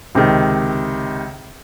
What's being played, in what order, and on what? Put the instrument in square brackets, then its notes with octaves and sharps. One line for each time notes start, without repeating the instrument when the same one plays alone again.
[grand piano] C#2 C3 D#3